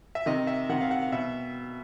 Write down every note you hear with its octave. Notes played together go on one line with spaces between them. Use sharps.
E5
C3 D#3 D#5
E5
C3 D#3 F#5
F5
F#5
F5
B2 E5